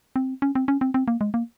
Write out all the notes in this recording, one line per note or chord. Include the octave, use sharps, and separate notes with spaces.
C4
C#4
C4
C#4
C4
C4
A#3
G#3
A#3